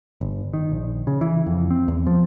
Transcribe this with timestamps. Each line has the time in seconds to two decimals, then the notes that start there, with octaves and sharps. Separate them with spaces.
0.21 G1
0.53 D#3
0.72 A#1
1.07 C#3
1.21 E3
1.46 F2
1.71 C4
1.88 E2
2.07 F3